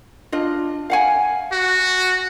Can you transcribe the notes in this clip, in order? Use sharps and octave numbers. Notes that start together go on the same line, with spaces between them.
D4 F4 D#5
F5 F#5 G#5
F#4